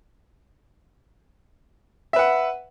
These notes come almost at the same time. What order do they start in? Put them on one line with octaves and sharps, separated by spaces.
E5 B4 F#5